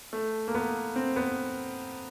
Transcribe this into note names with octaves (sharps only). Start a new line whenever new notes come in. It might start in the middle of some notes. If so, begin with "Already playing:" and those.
A3
A#3
B3
C4
B3